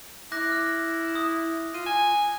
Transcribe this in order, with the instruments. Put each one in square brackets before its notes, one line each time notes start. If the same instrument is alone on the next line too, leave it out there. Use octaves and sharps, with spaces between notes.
[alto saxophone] E4 [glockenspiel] D6 F#6 A#6
[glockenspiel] F6
D#6
[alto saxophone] F4 [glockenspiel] D#7
[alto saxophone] G#5 [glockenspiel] E7